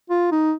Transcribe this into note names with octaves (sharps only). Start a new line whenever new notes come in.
F4
D#4